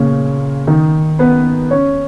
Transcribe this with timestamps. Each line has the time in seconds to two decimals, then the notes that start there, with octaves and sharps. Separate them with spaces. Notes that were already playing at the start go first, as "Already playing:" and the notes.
Already playing: A#2 C#3 A#3 C#4
0.67 D#3 D#4
1.19 B3 B4
1.71 C#4 C#5